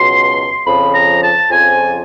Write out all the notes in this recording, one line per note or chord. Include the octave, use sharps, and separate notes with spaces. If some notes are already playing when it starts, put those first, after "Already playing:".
Already playing: C#2 B2 F#3 C6
F2 C#3 F3 B5
A#5
A5
F2 C#3 F3 G#5